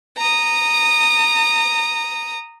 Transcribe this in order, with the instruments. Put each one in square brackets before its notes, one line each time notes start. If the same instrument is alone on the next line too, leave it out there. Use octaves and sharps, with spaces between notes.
[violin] A#5 D#6